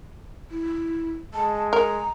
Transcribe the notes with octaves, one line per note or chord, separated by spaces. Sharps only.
E4
G#3 A5
A#4 A#5